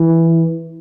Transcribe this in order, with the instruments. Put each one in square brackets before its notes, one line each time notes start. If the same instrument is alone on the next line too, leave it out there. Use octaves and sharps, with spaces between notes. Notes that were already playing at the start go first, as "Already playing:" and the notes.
Already playing: [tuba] E3